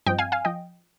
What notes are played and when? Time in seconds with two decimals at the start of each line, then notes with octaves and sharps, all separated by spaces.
0.06 G2 F3 C4 D#5 G5
0.18 F5 G#5
0.32 F5 G#5
0.45 F3 D#5 G5